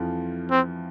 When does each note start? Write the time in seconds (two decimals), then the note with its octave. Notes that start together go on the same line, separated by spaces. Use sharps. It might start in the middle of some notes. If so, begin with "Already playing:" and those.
Already playing: F2 E3 F3
0.51 C4